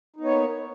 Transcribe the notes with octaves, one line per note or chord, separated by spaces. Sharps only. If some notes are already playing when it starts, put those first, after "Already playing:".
A#3 B3 D#4 C#5